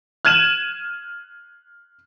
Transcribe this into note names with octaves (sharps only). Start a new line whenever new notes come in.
F6 F#6 G#6 D#7 E7 F#7